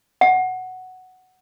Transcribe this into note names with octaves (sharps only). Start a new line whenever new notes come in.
F#5